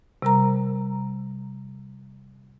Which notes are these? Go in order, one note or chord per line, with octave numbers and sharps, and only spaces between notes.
C3 G3 A#4 A#5